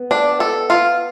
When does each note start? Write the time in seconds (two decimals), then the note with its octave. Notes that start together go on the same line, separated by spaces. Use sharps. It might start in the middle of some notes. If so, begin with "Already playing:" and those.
Already playing: B3
0.11 D4
0.40 A4
0.70 F4